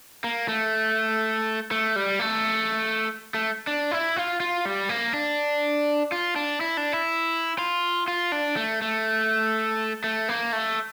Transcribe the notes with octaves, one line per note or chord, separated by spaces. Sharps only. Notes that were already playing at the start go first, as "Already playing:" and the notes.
A#3
A3
A3
G3
A3
A3
D4
E4
F4
F4
G3
A#3
D4
F4
D4
E4
D4
E4
F4
F4
D4
A3
A3
A3
A#3
A3